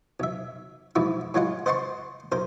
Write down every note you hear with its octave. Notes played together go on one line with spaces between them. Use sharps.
B1 E5
B1 G#2 F3 E4 E5
A2 F#3 G#3 F4 F#5
C5 D#5 F#5 A5 C6 C#6
B1 A#4 C5